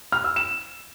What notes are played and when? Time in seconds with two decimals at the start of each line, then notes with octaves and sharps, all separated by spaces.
0.12 F6
0.24 E6
0.36 E7